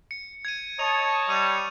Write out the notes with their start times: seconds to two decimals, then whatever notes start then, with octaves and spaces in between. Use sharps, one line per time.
0.11 C#7
0.45 G#6 C#7 D#7
0.79 C#5 D#5 A5 F7
1.29 G3 D#6 D#7 F7